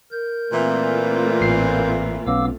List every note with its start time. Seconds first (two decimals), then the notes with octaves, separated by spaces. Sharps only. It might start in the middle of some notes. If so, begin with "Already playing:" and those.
0.12 A#4 G6
0.53 A#2 E3 A3 C4 F4
1.41 A1 C7
2.27 B1 B3 C#4 F5 D6 E6